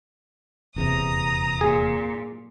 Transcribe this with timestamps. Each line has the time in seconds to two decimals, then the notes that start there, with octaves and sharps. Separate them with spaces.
0.76 D#1 E2 C3 A#5 D#6
1.61 A#2 G#4